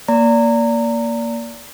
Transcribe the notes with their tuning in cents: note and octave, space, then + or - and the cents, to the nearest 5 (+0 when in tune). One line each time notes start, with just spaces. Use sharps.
A#3 +0 D5 -20 A#5 -25